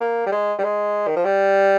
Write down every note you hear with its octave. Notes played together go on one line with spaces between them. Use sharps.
A#3
G3
G#3
G3
G#3
D#3
F3
G3